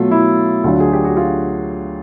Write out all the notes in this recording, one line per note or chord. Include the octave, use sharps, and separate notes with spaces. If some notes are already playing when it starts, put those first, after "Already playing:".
Already playing: B2 F#3 A3 F4
E4
D2 D3 F#3 F4
G#4
G4
F#4
F4